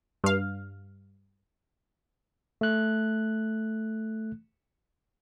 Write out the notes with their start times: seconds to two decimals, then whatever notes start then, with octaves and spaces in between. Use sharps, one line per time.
0.24 G2 F5
2.61 A3 F#6